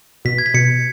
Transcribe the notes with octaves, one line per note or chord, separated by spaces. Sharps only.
B2 B6
G#6
B6
B2 C#7